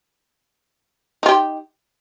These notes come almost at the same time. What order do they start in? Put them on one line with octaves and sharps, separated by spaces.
D#4 F4 G4